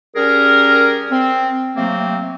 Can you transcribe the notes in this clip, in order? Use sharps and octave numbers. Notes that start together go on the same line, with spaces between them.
G3 C#4 G#4 A#4
C4
C3 F#3 A3 A#3 C4